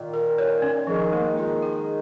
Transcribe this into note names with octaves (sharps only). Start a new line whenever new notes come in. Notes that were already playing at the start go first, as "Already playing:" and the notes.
Already playing: A#2 D#3
A#4
C#5
C#4
D#3 F3 G#3
A#3
D#3 G#3 F4
G#4